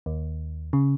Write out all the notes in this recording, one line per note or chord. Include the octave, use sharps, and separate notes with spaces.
D#2
C#3